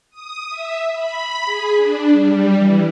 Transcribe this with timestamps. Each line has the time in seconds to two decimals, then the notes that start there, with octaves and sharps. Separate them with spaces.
0.11 D#6
0.49 E5
0.92 B5
1.45 G#4
1.75 D4
2.11 G3
2.55 E3